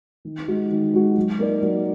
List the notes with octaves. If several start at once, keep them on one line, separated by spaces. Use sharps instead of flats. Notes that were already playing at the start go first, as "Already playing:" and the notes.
D#3
G#3 D#4 F#4
D#3
G#3 D#4 F#4
F#3
A#3 D#4 A#4 D5
F#3